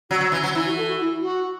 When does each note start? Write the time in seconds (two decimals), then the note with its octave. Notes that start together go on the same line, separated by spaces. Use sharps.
0.10 F#3 F#4
0.21 F#3
0.32 E3
0.43 F#3
0.54 E3 E4
0.65 F#4
0.77 A4
0.88 F#4
1.00 E4
1.21 F#4